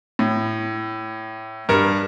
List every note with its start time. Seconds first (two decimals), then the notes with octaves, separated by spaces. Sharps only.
0.19 A2
1.69 G2 A#4